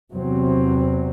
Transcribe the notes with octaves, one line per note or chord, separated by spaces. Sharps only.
E2 C3 F#3 C4